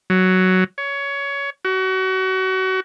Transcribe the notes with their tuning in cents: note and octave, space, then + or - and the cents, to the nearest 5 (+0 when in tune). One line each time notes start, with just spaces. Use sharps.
F#3 +5
C#5 +20
F#4 +30